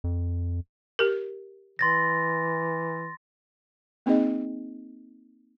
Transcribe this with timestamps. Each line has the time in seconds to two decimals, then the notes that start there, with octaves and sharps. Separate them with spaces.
0.04 F2
0.99 G4 A#4
1.79 E3 C6 A6 A#6
4.06 A#3 C4 D#4 G#4 D#5